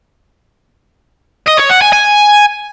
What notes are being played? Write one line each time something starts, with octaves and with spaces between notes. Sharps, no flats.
D#5
C#5
F#5
G#5
G#5